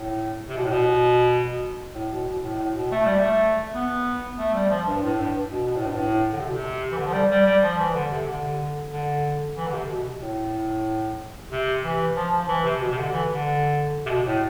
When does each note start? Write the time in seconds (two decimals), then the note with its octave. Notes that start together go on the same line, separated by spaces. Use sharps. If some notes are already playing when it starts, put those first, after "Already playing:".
Already playing: A2
0.49 C3
0.57 B2
0.65 A2
0.71 B2
1.94 A2
2.11 B2
2.27 B2
2.44 A2
2.59 A2
2.76 B2
2.92 A3
3.05 G3
3.20 A3
3.73 B3
4.38 A3
4.54 G3
4.70 F3
4.87 G2
5.03 A2
5.19 G2
5.51 B2
5.67 B2
5.77 A2
5.86 G2
5.95 A2
6.32 D3
6.39 C3
6.47 B2
6.53 C3
6.92 E3
6.97 D3
7.06 F3
7.13 G3
7.30 G3
7.46 G3
7.62 F3
7.79 E3
7.95 D3
8.11 C3
8.27 D3
8.92 D3
9.57 E3
9.68 D3
9.72 C3
9.89 B2
10.21 A2
11.51 C3
11.83 E3
12.16 F3
12.32 F3
12.48 E3
12.64 C3
12.81 B2
12.91 C3
12.97 D3
13.13 E3
13.29 D3
14.06 C3
14.10 B2
14.26 A2